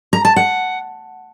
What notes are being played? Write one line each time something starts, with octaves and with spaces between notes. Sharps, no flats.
A#5
A5
F#5